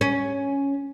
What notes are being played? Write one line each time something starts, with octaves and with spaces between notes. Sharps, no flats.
C#4